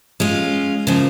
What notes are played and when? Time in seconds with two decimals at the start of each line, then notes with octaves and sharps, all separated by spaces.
0.20 G#3 C#4 F4
0.87 C#3 F3 A#3